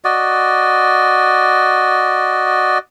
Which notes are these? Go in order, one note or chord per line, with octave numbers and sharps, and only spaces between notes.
F#4 D5 D#5